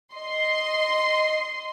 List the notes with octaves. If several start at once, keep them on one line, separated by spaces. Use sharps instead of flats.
D#5 C6